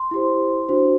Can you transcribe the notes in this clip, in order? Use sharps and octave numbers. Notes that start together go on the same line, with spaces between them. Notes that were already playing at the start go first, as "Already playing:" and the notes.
Already playing: C6
E4 G4 C5
D4 F#4 C5